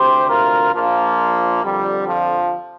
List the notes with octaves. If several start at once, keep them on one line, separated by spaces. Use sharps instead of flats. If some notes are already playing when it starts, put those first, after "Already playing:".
Already playing: D2 C3 G4 C5
F4 A#4
A#1 A#2 F3 A#3
F2 D3 G3
F3